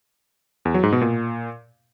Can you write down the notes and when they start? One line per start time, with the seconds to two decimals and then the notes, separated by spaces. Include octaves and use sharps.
0.65 E2
0.74 F#3
0.83 G#2
0.92 B2
1.01 A#2